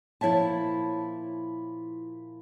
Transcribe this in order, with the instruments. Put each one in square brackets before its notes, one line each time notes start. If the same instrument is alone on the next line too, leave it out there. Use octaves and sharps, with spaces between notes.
[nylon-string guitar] A#2 F3 E4 C#5 E5 A5